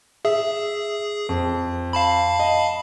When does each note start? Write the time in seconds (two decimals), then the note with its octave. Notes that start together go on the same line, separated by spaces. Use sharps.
0.25 G#4 E5
1.29 F2
1.93 F5 A5 B5
2.39 D#5